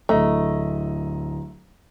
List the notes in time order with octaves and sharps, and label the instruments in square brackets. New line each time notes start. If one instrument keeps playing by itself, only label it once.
[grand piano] D1 D#5 A#5 [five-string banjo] A3